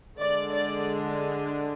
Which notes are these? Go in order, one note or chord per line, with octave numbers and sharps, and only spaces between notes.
D3 G#3 D4 D5
D5